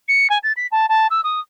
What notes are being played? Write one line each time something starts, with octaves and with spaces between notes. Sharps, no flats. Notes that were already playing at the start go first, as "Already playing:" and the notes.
C#7
G#5
A6
B6
A5
A5
E6
D#6